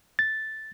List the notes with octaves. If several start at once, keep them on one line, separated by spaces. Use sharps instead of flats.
A6